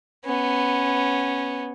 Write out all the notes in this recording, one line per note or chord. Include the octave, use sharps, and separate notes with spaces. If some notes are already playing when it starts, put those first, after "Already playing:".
B3 C#4